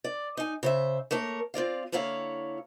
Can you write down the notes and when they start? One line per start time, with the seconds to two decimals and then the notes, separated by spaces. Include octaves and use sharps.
0.04 D5
0.37 D#4 G#5
0.63 C#3 C5 E5
1.11 A3 A#3 A#4 C#5
1.54 C4 F4 D5 F5
1.92 D3 A#3 E4 C#5 F5